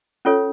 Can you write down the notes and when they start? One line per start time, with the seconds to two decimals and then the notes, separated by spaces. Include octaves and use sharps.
0.25 C#4 F4 A4 C#5